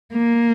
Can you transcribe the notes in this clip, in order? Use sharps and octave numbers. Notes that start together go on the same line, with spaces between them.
A#3